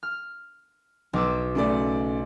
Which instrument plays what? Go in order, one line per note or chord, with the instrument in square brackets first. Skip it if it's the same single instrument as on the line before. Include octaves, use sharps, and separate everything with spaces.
[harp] F6
B1 D6 E6
[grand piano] C#3 A3 D5